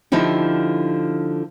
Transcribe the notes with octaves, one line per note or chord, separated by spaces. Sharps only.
D3 F3 D#4 E4 G4